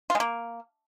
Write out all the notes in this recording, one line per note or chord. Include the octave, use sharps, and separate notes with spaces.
F4
G#3
A#3